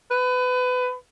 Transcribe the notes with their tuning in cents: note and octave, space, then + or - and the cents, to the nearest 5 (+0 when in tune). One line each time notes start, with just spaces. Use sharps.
B4 +25